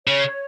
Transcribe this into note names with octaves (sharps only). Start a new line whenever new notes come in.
C#3 C#5